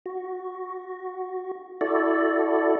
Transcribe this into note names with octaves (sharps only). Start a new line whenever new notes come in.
F#4
E4 F#4 A4 D5